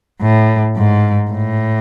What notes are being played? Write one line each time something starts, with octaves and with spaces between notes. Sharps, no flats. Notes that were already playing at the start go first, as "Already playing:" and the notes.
A2
G#2
A2